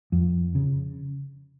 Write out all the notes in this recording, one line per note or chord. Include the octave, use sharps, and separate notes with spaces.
F2
C#3